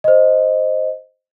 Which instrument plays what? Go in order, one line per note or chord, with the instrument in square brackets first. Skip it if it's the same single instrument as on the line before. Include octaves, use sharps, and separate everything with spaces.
[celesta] C5 D#5